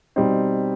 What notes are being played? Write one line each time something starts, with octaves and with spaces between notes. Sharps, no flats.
B2 G3 C4 D#4